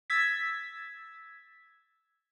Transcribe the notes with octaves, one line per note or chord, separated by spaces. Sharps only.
E6 G#6 A6 B6